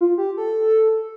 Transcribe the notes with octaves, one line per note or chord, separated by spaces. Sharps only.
F4
G4
A4